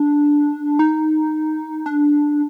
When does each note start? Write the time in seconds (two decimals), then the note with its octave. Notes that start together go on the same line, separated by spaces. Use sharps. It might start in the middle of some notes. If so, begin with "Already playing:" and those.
Already playing: D4
0.79 D#4
1.86 D4